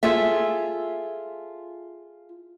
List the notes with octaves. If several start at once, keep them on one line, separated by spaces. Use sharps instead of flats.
F4 G#4 A4 E5